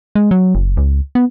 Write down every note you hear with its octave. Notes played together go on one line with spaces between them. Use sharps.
G#3
F#3
F#1
C#2
B3